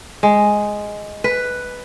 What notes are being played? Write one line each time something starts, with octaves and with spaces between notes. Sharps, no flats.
G#3
B4